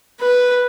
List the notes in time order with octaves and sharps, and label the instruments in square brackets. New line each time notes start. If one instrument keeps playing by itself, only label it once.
[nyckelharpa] B4